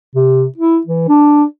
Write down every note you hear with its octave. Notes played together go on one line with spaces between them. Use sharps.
C3
E4
E3
D4